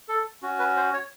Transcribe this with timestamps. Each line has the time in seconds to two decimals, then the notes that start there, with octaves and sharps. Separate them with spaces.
0.09 A4
0.42 C#4 F#4
0.59 B4
0.77 C5
0.94 C#5